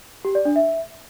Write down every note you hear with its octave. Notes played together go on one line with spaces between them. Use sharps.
G4
D5
D4
E5